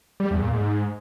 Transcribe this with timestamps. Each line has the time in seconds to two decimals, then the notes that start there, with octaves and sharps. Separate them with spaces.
0.20 G3
0.31 E2
0.42 A#2
0.53 G#2